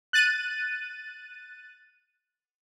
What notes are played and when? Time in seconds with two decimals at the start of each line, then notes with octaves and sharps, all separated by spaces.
0.13 F#6 A6 D#7